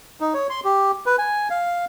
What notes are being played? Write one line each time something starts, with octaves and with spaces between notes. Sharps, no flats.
D#4
C#5
C6
G4
B4
G#5
F5